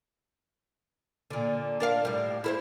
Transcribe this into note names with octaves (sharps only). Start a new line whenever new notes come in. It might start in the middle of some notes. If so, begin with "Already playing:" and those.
A#2 D3
D4 A#4 F5
A2 G3
E4 A4 C5